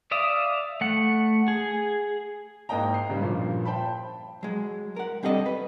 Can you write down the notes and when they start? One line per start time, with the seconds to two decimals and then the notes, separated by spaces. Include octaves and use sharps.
0.11 D5 E5 F5 D#6
0.81 A3 F#5
1.48 G#4
2.69 G#2 A#3 D#5 G5 A#5
2.94 C7
3.09 G#2 C#3 G3
3.22 G2 A#2 F3
3.65 C5 G5 A5 B5
4.43 F#3 G#3
4.96 A#4 F#5
5.23 G3 C4 D4 A4 D#5
5.46 B4